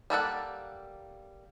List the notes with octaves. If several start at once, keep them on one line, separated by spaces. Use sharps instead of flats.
G3 A#3 A4 F#5